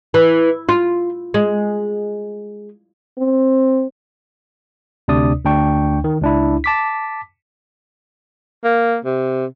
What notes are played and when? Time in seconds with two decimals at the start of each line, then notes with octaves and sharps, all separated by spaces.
0.14 E3
0.69 F4
1.34 G#3
3.18 C4
5.08 D2 C3 D4 D5 D#6
5.45 D2 D4 G5 C#6
6.04 D#3
6.21 C#2 D4 E4
6.64 A5 D6 B6
8.64 A#3
9.05 C3